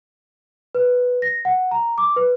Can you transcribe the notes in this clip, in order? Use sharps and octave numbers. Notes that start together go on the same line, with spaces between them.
B4
A#6
F#5
A#5
D6
B4